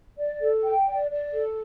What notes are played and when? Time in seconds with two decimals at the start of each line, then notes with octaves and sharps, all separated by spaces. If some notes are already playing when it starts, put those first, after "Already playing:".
0.18 D5
0.41 A4
0.65 G5
0.87 D5
1.11 D5
1.33 A4